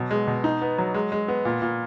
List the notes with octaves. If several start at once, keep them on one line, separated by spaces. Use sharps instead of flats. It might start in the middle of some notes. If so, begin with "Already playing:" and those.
Already playing: B2 F#3
G#3
B2
D#4
B3
F#3
G#3
G#3
B3
A#2
A#2